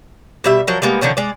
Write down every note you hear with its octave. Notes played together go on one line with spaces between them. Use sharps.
B2 G3 E5
F3 F#3 A#4
G3 G#3 A#3 B3
D3 D#3 F3 C#4
G#3 D5